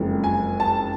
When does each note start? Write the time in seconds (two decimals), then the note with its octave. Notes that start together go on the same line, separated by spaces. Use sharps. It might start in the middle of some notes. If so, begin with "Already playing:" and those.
Already playing: F#1 F2 F3 G#3
0.24 G#5
0.60 A5